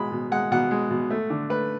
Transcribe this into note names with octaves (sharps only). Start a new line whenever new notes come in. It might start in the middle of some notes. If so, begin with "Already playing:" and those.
Already playing: B2 G#3 B5
B2
G#3 F#5
B2 F#5
G#3
B2
A3
D3
A3 B4